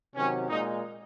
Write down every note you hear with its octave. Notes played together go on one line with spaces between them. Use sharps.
C3 D#3 F#3 C#4
A#2 G#3 D#4